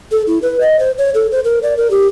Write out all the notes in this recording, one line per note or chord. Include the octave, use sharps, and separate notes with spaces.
A4
E4
B4
D#5
C5
C#5
A4
C5
A#4
D5
A#4
G4